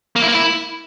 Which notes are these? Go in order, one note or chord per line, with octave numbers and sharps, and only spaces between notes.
A#3
E4
A#3
E4